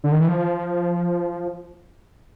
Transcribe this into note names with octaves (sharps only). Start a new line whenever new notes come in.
D3
D#3
E3
F3